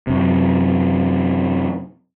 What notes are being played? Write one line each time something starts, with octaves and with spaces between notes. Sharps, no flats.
F#2 C3